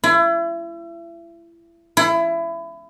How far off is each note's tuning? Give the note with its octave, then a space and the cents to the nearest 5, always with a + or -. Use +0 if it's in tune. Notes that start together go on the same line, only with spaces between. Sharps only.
E4 +35
E4 +25